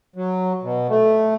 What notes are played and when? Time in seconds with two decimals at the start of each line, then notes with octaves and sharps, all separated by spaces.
0.16 F#3
0.63 B2
0.89 A3